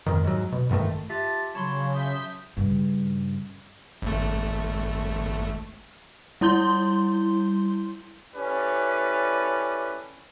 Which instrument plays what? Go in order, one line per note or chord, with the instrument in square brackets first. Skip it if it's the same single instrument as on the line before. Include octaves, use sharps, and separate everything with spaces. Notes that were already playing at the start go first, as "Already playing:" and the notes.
[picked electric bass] F2 G#2 D#3
G#2 F#3
B2
A1 G2 D#3 A3
[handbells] F4 G4 E5 [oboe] A5
[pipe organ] C#3 [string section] F#3 [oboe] C#5 [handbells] A5 B5 C6
[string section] E5 G6 B6 [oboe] D#6
[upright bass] G2 C#3
[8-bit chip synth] G#1 A3
[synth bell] G3 E4 C6 G6 G7
[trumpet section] C#4 E4 G4 A4 B4 D5